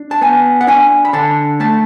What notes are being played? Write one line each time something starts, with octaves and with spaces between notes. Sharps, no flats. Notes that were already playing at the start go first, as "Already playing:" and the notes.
Already playing: D4
A5
B3 G#5
F#5
D4 G#5
B5
D3 A5
A3 A5